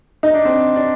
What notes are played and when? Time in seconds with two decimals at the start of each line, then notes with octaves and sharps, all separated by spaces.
0.23 D#4
0.34 D4
0.45 C4
0.76 D4